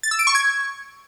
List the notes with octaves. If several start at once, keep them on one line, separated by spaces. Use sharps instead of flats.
A6
E6
D7
C#6
G#6